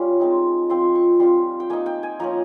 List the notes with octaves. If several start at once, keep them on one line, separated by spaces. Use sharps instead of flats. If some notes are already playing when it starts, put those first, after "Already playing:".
Already playing: G3 C#4 F4
G#3 C4 D#4
F3 C4 F4 C6
C#6
G3 C4 F4 C6
G5
A#3 D#4 G#5
G5
G#5
F3 A#3 C#4 A#5